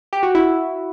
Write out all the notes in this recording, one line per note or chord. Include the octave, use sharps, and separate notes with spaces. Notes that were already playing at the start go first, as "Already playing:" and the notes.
G4
F#4
E4